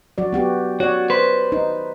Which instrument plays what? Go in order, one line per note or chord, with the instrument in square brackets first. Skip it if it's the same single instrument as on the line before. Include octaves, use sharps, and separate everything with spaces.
[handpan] F#3 F#4 D5
B3 F#4 G4
[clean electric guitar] F#4 [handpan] C#5 D5
[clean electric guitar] B4 C5
[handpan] D#4